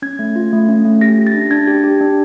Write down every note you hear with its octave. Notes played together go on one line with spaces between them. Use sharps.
C#4 G#6
A3
F4
A3
C#4
A3
G4 A#6
G4
A6
D4
D4 G#6
G4
G4
D4